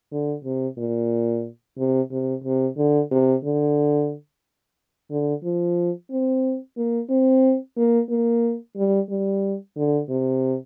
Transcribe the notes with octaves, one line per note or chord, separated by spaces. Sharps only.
D3
C3
A#2
C3
C3
C3
D3
C3
D3
D3
F3
C4
A#3
C4
A#3
A#3
G3
G3
D3
C3